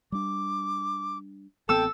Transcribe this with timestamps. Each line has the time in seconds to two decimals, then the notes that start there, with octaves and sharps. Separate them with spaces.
0.12 G3 D4 D6
1.69 A1 B3 C4 A4 G5 E6